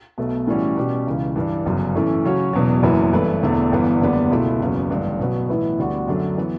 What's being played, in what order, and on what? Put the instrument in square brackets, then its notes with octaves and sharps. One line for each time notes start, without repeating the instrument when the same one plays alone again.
[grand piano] B1 B2 A3
A2 E3 G3 C#4 F#4
B2 G3 C#4 G4
C#2 C#3 E3
G2 E3 G3 D4
G1 F#2 C#3
A2 E3 A3 C#4
C#3 F#3 C#4 F#4 C#5
E1 E2 B2 F#3
F#1 F#2 E3 B3 E4
G2 E3 A3 E4 B4
E1 E2 D3 A3
G1 G2 E3 B3
F#1 E2 D3 G3 B3
C#2 B2 A3 E4
F#1 E2 C#3 F#3 B3
A1 G2 D3
B2 F#3 B3
A2 E3 B3 E4 B4
D2 D3 G3 B3 F#4
F#2 D3 F#3 A3 D4
E3 B3